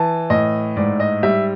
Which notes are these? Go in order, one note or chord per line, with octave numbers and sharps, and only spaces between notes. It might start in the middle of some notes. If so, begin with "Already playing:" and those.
Already playing: E3 A5
A2 D#5
G#2 D5
D#5
G3 E5